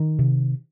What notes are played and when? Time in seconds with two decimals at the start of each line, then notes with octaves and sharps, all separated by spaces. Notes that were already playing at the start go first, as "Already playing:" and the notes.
Already playing: D#3
0.19 C3